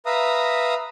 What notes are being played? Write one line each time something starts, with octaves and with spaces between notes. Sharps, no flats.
B4 E5 F5 A#5 D#6